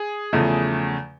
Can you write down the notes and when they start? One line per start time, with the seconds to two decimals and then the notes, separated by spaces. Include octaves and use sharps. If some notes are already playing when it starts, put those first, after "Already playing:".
Already playing: G#4
0.33 E2 C#3 F3 A3